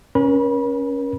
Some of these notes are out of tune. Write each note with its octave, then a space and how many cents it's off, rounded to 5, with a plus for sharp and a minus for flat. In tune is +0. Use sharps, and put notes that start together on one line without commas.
C#4 +0 A#4 +35 B5 -30